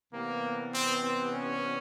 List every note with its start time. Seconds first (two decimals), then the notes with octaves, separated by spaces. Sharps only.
0.13 C3 E3 G3 A#3 B3
0.74 C4
1.03 C4
1.33 C#4